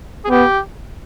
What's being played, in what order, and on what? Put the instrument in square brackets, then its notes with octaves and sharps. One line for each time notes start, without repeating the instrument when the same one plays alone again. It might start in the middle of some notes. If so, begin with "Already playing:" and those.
[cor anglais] G#4
[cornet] B3 [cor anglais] G4